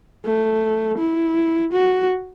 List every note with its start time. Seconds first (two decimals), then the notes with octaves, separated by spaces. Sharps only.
0.25 A3
0.98 E4
1.73 F#4